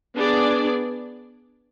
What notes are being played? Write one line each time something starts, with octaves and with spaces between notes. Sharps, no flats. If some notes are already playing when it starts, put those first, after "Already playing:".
B3 D4 G#4 D5